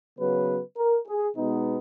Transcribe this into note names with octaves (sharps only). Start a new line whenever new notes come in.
C#3 F#3 B3 B4
A#4
G#4
B2 G#3 B3 D#4